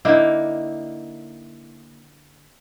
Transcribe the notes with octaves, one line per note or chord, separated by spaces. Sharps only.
D3 A#3 D#4 E4